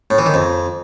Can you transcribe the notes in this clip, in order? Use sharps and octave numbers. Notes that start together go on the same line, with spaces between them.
A2
E3
D#3
F2